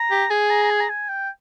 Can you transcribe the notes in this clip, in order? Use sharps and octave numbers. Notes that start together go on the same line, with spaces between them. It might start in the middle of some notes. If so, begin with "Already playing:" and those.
Already playing: A#5
G4
G#4 G#5
A#5
A#5
G#5
A#5
G#5
G5